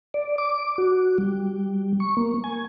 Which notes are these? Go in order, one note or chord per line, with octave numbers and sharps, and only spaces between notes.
D5
D6
F#4
G3
C#6
A#3
G#5